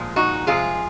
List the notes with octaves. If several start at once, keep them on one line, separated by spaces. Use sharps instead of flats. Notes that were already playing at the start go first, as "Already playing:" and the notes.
Already playing: A#2 F3 G#3
D#4 F#4
C3 F3 G#3 F4 G#4